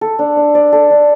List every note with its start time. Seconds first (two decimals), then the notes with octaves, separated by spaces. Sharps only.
0.01 A4
0.19 D4
0.37 D4
0.55 D5
0.72 A4
0.90 D4